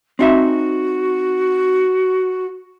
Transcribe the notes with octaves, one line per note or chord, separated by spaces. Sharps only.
C4 D#4 F#4 E5